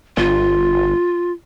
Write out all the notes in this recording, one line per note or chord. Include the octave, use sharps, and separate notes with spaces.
G1 F4